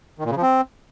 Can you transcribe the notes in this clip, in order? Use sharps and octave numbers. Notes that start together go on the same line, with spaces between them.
D#3
A#2
C#3
F3
C4